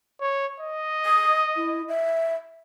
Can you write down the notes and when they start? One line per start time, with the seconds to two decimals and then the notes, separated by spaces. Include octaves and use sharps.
0.21 C#5
0.60 D#5
1.05 D#6
1.56 E4
1.88 E5